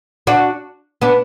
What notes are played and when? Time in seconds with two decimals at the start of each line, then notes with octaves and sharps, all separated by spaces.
0.27 D4 F#4
1.01 B3 D4